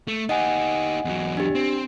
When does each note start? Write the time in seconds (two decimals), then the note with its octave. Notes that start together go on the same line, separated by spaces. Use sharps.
0.08 A3
0.29 D#4 G4 D#5 F#5 G#5
1.05 E2 F#3
1.37 D4 G4
1.55 C4